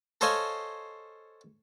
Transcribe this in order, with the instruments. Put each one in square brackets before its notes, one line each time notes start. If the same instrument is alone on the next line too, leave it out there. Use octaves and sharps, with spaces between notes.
[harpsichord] A4 C5 C#5 D#5 F5 G#5